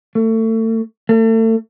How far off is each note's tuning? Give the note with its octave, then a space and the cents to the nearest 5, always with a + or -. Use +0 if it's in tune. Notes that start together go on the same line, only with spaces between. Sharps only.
A3 +30
A3 +35